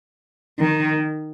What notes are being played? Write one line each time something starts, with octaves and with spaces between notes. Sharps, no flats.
D#3